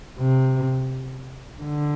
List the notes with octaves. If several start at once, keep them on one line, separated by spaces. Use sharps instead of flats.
C3
D3